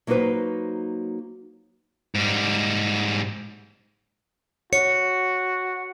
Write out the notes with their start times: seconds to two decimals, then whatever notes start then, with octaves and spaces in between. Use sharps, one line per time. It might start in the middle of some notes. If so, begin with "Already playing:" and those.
0.07 F#3 A#3 D#4 F#4 B4 C5
2.15 G#2 G3
4.73 F#4 C#5 C#7